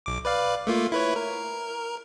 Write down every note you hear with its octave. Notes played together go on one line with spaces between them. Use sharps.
B1 D6
B4 D5 F5
A3 A#3 F4
E4 B4 C#5
A#4